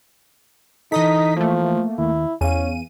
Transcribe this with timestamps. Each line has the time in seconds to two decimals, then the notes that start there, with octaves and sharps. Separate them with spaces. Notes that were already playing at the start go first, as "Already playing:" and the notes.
0.92 E3 D#4 A4 D#5 D#6 B6
1.37 F3 A3 A#3
1.98 D#2 E4
2.41 E2 C#4 F5 G#5 D#7